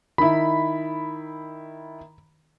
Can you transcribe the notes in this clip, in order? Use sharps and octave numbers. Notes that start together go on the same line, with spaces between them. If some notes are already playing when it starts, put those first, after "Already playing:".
D#3 E4 B5